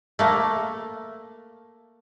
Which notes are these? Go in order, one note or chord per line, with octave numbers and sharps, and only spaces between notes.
A3 A#3